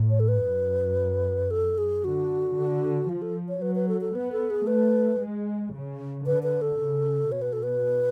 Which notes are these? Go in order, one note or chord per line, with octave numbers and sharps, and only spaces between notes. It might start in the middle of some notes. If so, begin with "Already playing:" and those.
Already playing: A2
C#5
A4
B4
F#2
A4
G#4
D3 F#4
D3
F3 F4
A4
C#5
F#3 B4
B4
A4
A4
B3 B4
A4
G#4
A3 B4
G#3
C#3
D3 B4
B4
A4
C#3
B2 C#5
B4
A4
B4